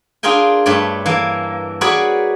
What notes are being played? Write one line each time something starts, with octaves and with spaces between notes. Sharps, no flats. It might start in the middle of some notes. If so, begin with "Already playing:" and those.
D4 F4 G#4 A#4 G5 G#5
G2 A3 C#5 D5
E3 A#3
F#4 G#4 A#4 B4 C#5 D5